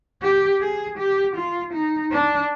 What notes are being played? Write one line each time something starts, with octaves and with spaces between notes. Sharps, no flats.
G4
G#4
G4
F4
D#4
D4